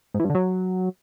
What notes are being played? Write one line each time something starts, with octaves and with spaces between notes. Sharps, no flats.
G#2
E3
G2
D3
F#3